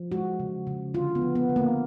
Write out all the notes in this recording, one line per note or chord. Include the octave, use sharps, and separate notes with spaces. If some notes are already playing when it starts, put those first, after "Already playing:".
Already playing: F3
G#3 F#4
C#3
C#3
D3 F4
B3
F3
B3
D3
A#3